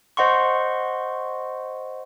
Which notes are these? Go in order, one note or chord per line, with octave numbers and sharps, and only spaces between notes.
C5 D#5 F#5 C6 C#6